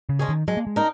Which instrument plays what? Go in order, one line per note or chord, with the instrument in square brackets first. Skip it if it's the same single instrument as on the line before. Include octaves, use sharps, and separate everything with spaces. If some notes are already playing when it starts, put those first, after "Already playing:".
[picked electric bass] C#3
[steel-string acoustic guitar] G#3 C#4 G#4
[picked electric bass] D#3
[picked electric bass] F#3 [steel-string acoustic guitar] G#3
[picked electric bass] A#3
G#3
[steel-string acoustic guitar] D#4 A#4